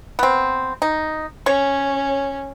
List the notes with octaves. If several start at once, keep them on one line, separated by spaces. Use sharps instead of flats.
B3 C4
D#4
C#4 C#5